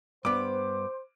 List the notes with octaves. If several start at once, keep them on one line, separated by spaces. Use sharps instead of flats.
G2 B3 C5 D6